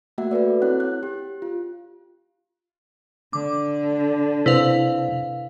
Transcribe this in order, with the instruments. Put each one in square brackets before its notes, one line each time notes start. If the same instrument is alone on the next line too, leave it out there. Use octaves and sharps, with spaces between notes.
[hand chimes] A3 A#3 F#4 E5 F#5
F#4 A4 B4 D5
C4 E4 C#5 F#5 F#6
F#6
G4
F4
[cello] D3 [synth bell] D6
[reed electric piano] C3 C5 [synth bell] E4 B4 F5